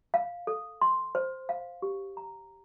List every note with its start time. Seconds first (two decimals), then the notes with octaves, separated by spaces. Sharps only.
0.14 F5
0.47 A4
0.81 C6
1.15 C5
1.49 F5
1.82 G4
2.17 A#5